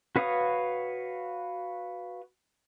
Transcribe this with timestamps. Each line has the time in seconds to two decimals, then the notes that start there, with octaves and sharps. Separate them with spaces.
0.16 F#4 B4 C#5 F5 D#6